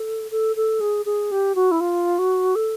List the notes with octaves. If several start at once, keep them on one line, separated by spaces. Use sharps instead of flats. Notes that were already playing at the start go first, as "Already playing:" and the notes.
Already playing: A4
A4
A4
G#4
G#4
G4
F#4
E4
F4
F#4
A4